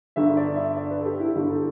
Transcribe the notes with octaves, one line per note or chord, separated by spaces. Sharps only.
G1 G2 D3 E5
D5
E5
D5
B4
A4
G4
E4
G1 G2 D3 G4
A4